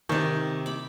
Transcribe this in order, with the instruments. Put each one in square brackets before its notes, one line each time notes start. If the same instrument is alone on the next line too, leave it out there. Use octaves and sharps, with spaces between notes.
[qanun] C3 D5 [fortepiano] D#3
[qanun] B5 D6